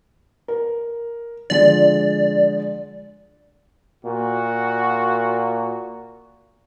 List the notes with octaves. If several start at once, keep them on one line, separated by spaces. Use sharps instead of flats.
A#4
D3 F3 G#3 D5
A#2 F#4